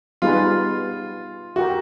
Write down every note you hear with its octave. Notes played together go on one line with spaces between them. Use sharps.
G3 B3 D#4 F4 G#4 B4
E4 F#4 G4 A#4